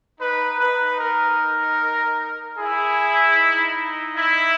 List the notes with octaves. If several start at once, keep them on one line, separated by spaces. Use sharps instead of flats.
D#4 B4
D#4 B4
A#4
E4 G#4
D#4
E4